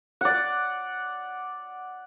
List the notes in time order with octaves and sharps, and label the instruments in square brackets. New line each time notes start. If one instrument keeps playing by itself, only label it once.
[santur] D5 F#5